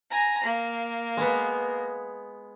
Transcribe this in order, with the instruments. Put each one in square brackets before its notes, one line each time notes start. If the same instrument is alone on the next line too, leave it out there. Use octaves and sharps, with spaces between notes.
[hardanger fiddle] G#5 A#5
A#3
[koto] G#3 B3